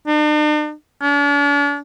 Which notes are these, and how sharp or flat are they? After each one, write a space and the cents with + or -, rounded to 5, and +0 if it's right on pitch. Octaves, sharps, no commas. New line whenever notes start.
D4 +45
D4 -45